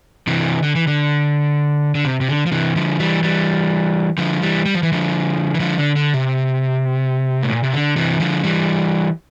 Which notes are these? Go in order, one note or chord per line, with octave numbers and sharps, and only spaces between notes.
C3 E3
D3
E3
D3
D3
C3
C3
D3
F3
C3 E3
D3 F3
E3 G3
E3 G3
D3 F3
E3 G3
G3
F3
E3
D3 F3
E3
D3 F3
D3
D3
C3
A2
A#2
C3
D3
C3 E3
D3 F3
E3 G3